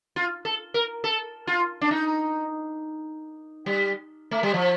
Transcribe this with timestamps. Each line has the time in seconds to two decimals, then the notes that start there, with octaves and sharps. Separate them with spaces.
0.16 F4
0.45 A4
0.74 A#4
1.04 A4
1.47 F4
1.81 D4
1.91 D#4
3.66 G3
4.31 A3
4.43 G3
4.54 F3